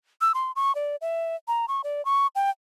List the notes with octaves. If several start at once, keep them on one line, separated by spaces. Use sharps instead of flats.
E6
C6
C#6
D5
E5
A#5
C#6
D5
C#6
G5